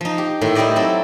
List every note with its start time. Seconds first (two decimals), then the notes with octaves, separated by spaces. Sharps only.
0.01 F3 D#4
0.18 G4
0.41 A2 D#3
0.55 G3 D#4 E4 G4 D5 D#5
0.76 F#3 C4 E4 A4